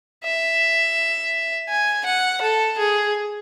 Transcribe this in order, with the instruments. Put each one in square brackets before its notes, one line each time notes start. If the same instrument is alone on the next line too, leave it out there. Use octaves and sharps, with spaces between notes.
[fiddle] E5
G#5
F#5
A4
G#4